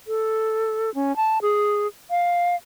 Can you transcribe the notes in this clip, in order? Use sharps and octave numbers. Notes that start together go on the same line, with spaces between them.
A4
C#4
A5
G#4
F5